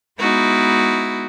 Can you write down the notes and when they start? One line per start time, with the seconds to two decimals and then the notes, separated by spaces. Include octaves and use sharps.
0.19 G#3 B3 D#4 E4 F#4